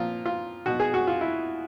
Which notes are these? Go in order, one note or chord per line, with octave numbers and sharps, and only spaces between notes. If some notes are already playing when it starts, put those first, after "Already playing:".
Already playing: A#2 F3 F4
F4
B2 F#4
G#4
F#4
F4
E4